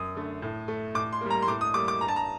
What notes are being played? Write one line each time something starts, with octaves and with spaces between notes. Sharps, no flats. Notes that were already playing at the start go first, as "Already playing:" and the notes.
Already playing: F#2 D#6
D3 A3
A2
A3
A2 D6
C6
G3 A#3
A#5
C6
A2 D6
D#6
G3 A#3 D6
D6
G2 A#5
A5
A#5